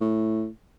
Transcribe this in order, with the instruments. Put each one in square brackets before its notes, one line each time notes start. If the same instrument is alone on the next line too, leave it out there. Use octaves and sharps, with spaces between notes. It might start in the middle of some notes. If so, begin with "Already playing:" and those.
[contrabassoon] A2